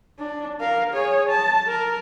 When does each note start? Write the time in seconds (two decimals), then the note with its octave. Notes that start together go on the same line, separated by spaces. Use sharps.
0.19 D4
0.61 A#4 F5
0.93 G#4 C#5
1.29 A5
1.68 A#4